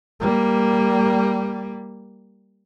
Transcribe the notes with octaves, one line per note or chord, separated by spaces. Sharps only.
G3 A#3